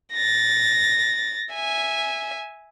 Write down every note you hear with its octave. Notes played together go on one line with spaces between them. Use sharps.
A6 A#6
E5 G#5